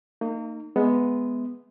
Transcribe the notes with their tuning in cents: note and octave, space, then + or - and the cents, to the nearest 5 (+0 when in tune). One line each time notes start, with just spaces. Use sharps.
A#3 -35 D#4 -15
G#3 +0 B3 +0 E5 -20